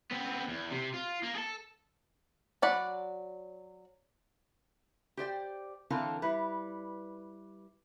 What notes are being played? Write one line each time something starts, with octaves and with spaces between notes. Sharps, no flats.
B3 C4
E2
C3
F4
A#3
G#4 A4
F#3 D5 F#5 B5
G4 C5 D5 G5
D3 E3 C4 F4 A4 A#4
G3 E4 B4